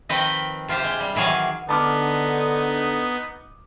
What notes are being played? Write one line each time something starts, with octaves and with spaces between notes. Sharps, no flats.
D#3 F3 C4 B4 D#5 G5
C3 F4 G4 C5
G#3
G3
D#3 E3 F#3 G#4 F5
D3 B3 D#4 A5 D6 F6